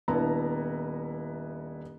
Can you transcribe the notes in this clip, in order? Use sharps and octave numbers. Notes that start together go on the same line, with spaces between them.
D#1 B3 D4 E4 A5 A#5